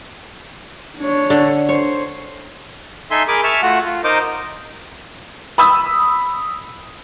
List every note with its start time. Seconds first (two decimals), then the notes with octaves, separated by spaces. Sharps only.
0.99 D4 C#5
1.30 D3
1.69 C5 C#5
3.11 D#4 A4 E5 G#5 C6
3.28 G#4 A#4 G#5 B5 D6
3.44 E5 G#5 A5 C#6 F6
3.62 A3 F4 F#4 F#5
3.85 F4
4.04 D#4 A#4 C5 D#5 D6
5.58 B5 D#6 E6